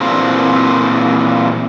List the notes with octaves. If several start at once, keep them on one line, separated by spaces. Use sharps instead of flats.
A#2 E3 A#3 C4